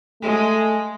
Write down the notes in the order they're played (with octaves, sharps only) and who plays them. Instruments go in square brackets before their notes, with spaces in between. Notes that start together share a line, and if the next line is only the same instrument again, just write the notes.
[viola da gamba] G#3 [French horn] A3